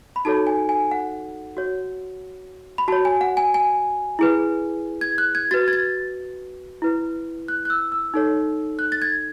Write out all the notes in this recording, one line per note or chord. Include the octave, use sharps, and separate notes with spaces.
B5
D#4 F#4 A4 C#5 A5
G#5
G#5
F#5
F#4 C#5
B5
F#4 C#5 A5
G#5
F#5
G#5
G#5
E4 G#4 B4
G#6
F#6
G#6
F#4 B4 A6
G#6
A6
E4 B4
F#6
F#6
E6
E6
D#4 A4 C#5
F#6
A6
G#6